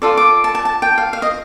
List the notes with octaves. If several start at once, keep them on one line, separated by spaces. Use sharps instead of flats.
F4 A4 D5
D6
A5
A5
A5
G5
F5
F5
D#5